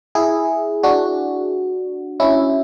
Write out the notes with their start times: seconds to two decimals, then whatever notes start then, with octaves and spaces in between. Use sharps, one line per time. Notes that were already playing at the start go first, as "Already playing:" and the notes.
0.15 E4 G#4
0.83 D4 F#4
2.20 C#4 E4